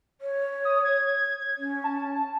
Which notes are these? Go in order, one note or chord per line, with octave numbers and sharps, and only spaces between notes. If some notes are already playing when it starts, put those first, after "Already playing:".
C#5
D#6
G#6
C#4
A5